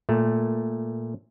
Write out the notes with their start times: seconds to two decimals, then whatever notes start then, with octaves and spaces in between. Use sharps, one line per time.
0.09 A#2 A3